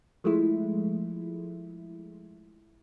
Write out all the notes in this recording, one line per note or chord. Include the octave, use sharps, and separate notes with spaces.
F3 G#3 A3 E4